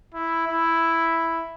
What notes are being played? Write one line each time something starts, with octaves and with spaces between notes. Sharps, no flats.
E4
E4